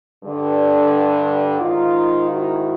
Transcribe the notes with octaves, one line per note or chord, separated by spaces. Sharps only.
G2 D3
G#2 D#3 D#4 F4
E4 F#4